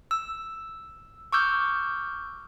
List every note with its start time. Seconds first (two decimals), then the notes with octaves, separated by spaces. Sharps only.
0.11 E6
1.33 C#6 D6 E6 F6 G6